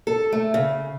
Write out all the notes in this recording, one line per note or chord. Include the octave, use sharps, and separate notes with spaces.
A4
A3
C#3